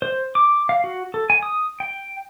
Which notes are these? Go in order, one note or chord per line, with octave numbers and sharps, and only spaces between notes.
C5
D6
F5
F#4
A4
G#5
D#6
G5